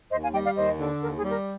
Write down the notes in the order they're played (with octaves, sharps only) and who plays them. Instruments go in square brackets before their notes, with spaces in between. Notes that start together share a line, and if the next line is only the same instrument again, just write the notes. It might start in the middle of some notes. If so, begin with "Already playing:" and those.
[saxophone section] D#2 [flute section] C5 D#5
[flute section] F5 G#5
[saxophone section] G3 [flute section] D#5 G5
[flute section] D5 F5
[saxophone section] D#2 [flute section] C5 D#5
[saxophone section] D3
[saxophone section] D#2 [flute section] A#4
[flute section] G#4
[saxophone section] G3
[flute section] A#4